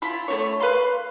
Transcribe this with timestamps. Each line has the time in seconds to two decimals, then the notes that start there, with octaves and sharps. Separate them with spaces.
0.02 E4 F4 B5
0.28 A3 C4 C#5
0.60 B4 F5 B5 C6